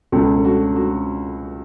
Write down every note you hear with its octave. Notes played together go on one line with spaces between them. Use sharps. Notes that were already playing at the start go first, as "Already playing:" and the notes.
C#2 B2 A4
A4
F#4
F#4